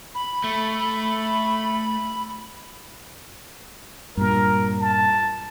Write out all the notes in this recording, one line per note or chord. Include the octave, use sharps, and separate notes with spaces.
B5
A3
G2 A#2 A#4
A5